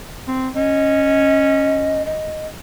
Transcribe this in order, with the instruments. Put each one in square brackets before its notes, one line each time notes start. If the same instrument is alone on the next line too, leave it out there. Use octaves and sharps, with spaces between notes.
[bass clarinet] C4
[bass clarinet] C#4 [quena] D#5
[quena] D#5